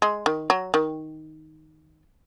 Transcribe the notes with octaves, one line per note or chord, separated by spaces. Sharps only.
G#3
D#3
F#3
D#3